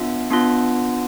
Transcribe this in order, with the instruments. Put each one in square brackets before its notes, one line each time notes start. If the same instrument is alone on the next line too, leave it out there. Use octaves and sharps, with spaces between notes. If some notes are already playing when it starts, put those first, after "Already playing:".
Already playing: [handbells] B3 D4 F4 E5
B3 D4 F4